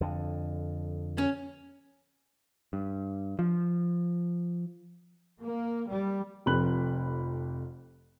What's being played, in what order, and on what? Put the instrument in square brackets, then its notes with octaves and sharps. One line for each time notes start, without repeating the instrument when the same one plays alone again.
[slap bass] F2 D3
[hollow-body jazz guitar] C#4
[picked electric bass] G2
F3
[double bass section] A#3
G3
[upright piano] F1 F2 B5 F#6 F#7